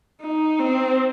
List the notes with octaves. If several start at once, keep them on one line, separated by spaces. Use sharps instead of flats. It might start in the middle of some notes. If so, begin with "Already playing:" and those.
D#4
C4